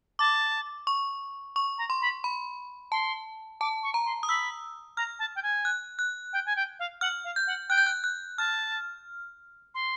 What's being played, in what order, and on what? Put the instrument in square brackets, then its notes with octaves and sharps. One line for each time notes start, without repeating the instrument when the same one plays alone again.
[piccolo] A5 [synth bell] D6
[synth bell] C#6
C#6
[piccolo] A#5
[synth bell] C6
[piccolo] B5
[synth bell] B5
[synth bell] A5 [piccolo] C6
[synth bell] A5 [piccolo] D6
[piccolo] C#6
[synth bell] A#5
[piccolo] C6
[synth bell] D#6
[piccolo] B5 [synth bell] E6
[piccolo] A#5 [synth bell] F6
[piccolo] A5
G5
G#5
[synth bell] F#6
F#6
[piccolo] G5
G#5
G5
F5
[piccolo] F#5 [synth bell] F6
[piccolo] F5
[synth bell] G6
[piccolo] F#5
[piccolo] G5 [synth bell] F#6
[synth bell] G6
F#6
F#6
[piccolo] A5 [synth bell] F6
[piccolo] C6